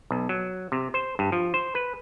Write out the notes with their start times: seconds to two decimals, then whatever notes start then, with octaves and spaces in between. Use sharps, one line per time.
0.11 B1
0.29 F#3
0.72 C3
0.94 C5
1.19 G2
1.32 F3
1.54 C5
1.75 B4